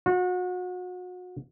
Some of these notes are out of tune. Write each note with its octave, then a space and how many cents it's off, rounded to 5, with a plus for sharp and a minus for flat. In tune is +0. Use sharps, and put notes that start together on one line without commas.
F#4 -35